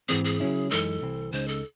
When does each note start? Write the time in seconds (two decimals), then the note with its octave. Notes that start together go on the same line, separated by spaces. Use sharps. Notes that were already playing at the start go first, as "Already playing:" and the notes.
0.09 G#2 E3 C4 G#4
0.25 G#4
0.40 C#3 F#3 C#4 E4
0.71 F#2 E3 G#3 D#4 A4
1.01 C2 C3 E3 C4
1.32 C#2 C#3 G#3 D#4 C5
1.48 A4